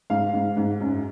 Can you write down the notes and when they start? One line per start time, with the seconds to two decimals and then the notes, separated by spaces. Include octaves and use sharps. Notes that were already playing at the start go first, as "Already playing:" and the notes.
0.10 G#2 F5
0.34 G#2
0.57 G#2
0.80 F#2